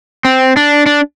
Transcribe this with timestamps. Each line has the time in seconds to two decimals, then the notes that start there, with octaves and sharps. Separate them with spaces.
0.25 C4
0.57 D4
0.86 D4